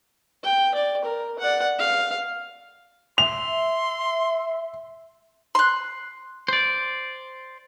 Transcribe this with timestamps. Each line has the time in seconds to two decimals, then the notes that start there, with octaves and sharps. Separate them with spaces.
0.44 G5
0.75 D5
1.05 A#4
1.39 D5 F#5
1.79 F5
3.18 E5 C6 F7
5.55 C6 F#6
6.48 C5 D5